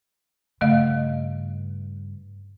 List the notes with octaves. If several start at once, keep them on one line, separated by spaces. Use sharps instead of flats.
G2 C#3 A3 D#5 F5